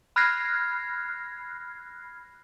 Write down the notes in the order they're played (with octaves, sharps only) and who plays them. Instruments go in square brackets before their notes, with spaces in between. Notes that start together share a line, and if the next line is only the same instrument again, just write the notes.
[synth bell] B5 F6 F#6 G#6 A#6 C7